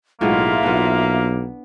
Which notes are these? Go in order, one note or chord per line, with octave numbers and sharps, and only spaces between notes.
B1 A2 G#3 A#3 B3 F4 E5
B1 B3 D4